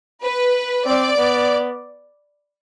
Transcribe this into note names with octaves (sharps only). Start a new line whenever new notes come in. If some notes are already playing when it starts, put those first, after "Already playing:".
B4
C4 D5
B3